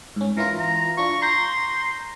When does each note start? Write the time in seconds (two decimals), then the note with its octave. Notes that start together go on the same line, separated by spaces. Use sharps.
0.16 G#2 C#4
0.37 E3 E4 F4 A#4
0.59 A#5
0.98 D4 F4 C#6
1.22 A#5 C6 G6 A#6